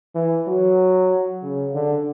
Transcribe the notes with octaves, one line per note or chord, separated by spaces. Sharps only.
E3
F#3
C#3
D3